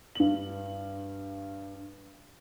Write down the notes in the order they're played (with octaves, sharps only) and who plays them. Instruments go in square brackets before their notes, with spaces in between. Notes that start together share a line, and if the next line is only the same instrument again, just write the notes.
[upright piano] G2 F#7